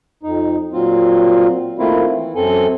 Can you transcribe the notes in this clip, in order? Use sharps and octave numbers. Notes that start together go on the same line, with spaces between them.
F2 D#4
A#2 F#3 C4 F4
D#3 A3 A#3 C4 E4 F4
E3
F#2 C4 A4 G#5